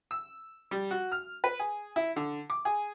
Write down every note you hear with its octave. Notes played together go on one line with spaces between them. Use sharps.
E6
G3
F#4
F6
B4
G#4
E4
D3
D6
G#4